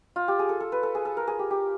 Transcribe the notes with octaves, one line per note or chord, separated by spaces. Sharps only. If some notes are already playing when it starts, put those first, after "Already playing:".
F4
G4
G#4
A4
A4
B4
A4
G#4
A4
A#4
G#4
G4
G4